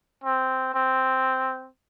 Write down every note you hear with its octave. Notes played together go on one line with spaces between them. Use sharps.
C4
C4